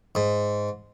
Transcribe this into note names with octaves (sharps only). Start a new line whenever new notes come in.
G#2